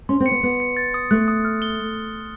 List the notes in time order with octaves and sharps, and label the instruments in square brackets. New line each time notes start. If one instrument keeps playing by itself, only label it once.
[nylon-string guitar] C#4 [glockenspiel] C6
[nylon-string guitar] C4
[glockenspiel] C#7
[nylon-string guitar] B3
[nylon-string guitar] B3 [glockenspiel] C#7
[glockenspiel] C#7
A6
D#6
[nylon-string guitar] A3 [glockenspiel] F#6
[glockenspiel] D#6
F6
G7